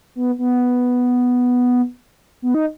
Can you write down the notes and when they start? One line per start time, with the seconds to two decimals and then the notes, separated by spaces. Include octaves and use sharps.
0.15 B3
0.38 B3
2.42 B3
2.54 D#4